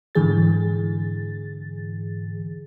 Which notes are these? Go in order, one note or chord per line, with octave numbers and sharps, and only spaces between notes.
G#2 D3 E3 G#4 A6